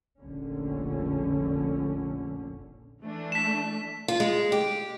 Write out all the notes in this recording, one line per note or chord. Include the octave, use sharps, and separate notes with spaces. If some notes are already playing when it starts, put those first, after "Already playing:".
F1 A#1 D3 C#4
E3 A3 D4
B6 E7
F4
G#3
G4